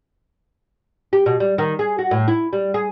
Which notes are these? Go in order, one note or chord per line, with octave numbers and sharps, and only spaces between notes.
G4
B2
G3
D#3
G#4
F#4
A2
E4
G3
G#4